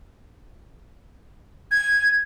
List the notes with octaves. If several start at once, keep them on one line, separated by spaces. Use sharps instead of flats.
G#6